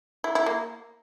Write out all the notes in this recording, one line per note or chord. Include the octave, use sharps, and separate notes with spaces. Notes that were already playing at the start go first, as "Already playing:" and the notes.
E4
E4
A#3